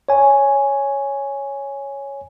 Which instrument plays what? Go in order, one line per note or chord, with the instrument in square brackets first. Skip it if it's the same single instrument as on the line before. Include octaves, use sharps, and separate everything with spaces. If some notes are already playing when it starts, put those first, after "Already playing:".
[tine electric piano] C#5 G#5